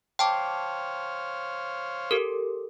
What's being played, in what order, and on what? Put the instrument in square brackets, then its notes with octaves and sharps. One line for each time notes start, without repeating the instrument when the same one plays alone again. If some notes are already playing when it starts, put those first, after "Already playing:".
[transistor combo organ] C5 C#5 F5 [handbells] G5 A5 D6
[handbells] G4 A4 A#4